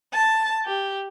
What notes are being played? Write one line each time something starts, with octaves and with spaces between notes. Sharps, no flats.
A5
G4